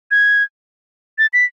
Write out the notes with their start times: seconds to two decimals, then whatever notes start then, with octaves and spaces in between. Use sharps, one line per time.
0.11 G#6
1.18 A6
1.33 B6